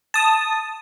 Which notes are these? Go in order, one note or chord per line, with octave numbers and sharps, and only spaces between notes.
A5 D#6